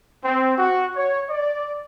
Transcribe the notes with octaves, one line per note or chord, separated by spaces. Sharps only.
C4
F#4
C#5
D5